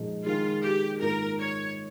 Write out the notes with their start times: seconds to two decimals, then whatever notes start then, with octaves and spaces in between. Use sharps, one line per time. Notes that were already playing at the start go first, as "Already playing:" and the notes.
Already playing: A#2 F3 G#3 D#4 G#4
0.25 D#3 G#3 D#4 F4 G#4
0.64 G4
1.01 G#2 D#3 A#3 F4 A#4
1.39 C#5